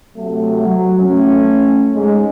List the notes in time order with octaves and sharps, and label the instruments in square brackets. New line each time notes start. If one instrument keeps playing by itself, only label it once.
[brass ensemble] C3 F#3 A3
F#3
A3 C#4
G#2 G#3